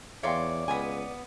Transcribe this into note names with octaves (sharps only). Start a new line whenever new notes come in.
E2 C#5 D5 E5 F5 G5 C6
C#2 B3 G#5